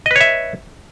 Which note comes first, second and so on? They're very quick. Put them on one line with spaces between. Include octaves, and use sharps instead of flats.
D#5 B4 C#5 E5